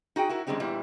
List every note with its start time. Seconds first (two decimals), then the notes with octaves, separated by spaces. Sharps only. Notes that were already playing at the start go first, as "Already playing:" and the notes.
0.16 D#4 F#4 G#4 G5
0.29 E4 F#4 A#4
0.47 F#2 D#3 G3 G#3 C4 D4
0.60 E2 A#2 E3 G3